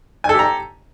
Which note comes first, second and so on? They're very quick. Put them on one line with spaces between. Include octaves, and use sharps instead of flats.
G#5 A4 G4 A#5